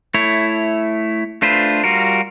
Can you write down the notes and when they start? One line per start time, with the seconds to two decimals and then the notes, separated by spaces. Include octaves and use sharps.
0.14 A3 E4 C#5
1.42 A3 D4 F4 B4 C5
1.84 G3 F4 F#4 A#4